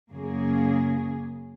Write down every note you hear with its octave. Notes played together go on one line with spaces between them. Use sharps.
F#2 C#3 A#3 G#4